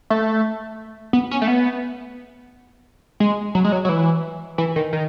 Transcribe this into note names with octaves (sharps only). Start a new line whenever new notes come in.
A3
B3
C#4
A3
B3
G#3
F#3
G#3
F#3
F#3
E3
E3
D#3
D#3